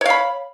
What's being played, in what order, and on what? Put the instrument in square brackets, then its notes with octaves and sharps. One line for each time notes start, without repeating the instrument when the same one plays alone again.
[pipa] C#5
F5
B5